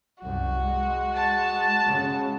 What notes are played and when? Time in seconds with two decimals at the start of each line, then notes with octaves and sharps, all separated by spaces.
0.23 C2 F#2 F#4
0.60 G#3
1.16 A5
1.85 C#3 G#3